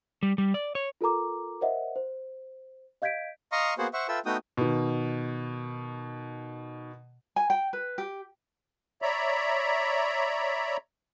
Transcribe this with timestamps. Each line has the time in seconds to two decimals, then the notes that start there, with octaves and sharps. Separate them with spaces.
0.23 G3
0.38 G3
0.54 D5
0.75 C#5
1.01 F4 A4 A#4 A#5 D6
1.61 A#4 C5 C#5 D#5 E5 F#5
1.96 C5
3.02 D#5 F5 G6 G#6 B6 D7
3.52 D#5 F5 A#5 C6 C#6 D#6
3.78 A#3 B3 F#4 G#4 C5 F#5
3.93 C5 E5 F#5 C#6
4.08 F4 A4 B4 E5 G5 E6
4.26 A3 B3 D#4 F#4 G5 D#6
4.57 B2 D#3
7.36 G#5
7.50 G5
7.73 B4
7.98 G4
9.02 C#5 D5 E5 A#5 B5